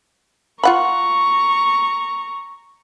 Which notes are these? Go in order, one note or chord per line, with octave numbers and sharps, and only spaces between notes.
F4 F#5 A#5 B5 C#6